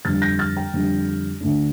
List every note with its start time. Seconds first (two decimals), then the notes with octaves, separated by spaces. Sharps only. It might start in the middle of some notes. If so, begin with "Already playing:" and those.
0.05 F2 D3 G3 F6 A6
0.22 G6 A#6
0.39 F6 A6
0.56 G5 A#5
0.74 F2 D3 G3
1.41 D2 D3 A3 D4